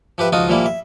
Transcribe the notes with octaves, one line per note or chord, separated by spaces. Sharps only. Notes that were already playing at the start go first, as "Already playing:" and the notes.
F3 G4 B4 E5
C#2 F3 D#4 F4 F#4 D#6
A#2 F3 G3 A#3 E4
E5